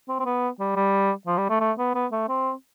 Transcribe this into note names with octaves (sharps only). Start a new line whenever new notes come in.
C4
C4
B3
G3
G3
F3
G3
A3
A3
B3
B3
A3
C4